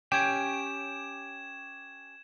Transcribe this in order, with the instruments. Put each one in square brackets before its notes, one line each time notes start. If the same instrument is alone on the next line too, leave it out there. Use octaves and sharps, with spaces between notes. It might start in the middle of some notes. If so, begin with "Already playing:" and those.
[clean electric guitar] C#4 G4 G5 [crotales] G#6 E7